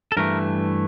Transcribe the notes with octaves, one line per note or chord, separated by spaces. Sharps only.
A4
G2 E3 A3 A#4